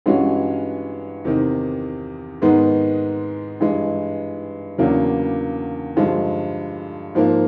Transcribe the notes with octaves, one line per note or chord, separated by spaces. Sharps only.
G2 E3 G#3 C#4 F#4
E2 C3 D#3
G#2 D#3 G#3 B3 D#4
G2 E3 G#3
E2 C#3 F#3 A#3 D4
G2 D3 F3 G#3
G#2 F3 A#3